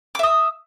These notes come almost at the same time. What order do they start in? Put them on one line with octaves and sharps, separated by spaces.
D6 E5 D#6